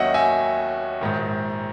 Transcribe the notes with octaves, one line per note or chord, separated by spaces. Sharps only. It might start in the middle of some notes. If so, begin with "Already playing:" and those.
Already playing: D#2 D#3 F#3 C#4 C#5 D#5 E5 F#5
E5 G#5
A#1 G#2 D#3